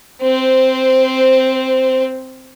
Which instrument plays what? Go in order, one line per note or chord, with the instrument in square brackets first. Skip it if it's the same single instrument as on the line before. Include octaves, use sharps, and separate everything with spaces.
[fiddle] C4 C5